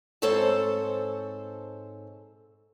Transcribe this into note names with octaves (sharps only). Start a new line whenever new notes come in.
G#2 C4 A4 C5 C#5 A5